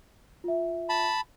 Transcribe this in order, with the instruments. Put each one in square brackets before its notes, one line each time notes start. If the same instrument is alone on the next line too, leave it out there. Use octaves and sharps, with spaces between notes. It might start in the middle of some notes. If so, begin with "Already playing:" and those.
[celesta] F4 E5
[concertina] A5 B5